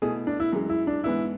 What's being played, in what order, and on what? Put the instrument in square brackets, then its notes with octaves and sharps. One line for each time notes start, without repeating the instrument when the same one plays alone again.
[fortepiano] B2 A3 E4 [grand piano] G#4
[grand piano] D4
E4
[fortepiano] F#2 E3 G#3
[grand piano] E4
D4
[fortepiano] G#2 E3 B3 D4 [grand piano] E4